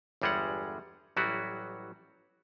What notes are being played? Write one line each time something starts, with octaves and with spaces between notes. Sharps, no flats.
G1 E2 G3 G#3 G#4 F#5
A1 F#3 G3 E4 F#4